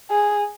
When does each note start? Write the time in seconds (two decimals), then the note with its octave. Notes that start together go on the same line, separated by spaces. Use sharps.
0.11 G#4